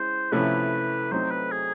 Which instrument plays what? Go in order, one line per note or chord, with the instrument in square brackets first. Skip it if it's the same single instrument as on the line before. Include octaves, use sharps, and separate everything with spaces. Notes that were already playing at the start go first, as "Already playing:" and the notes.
Already playing: [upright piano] G#3 C#4 E4 [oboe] C5
[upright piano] C3 F3 A3 C#4 E4 [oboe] B4
[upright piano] F#3 A3 C4 D#4 [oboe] C5
[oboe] B4
G#4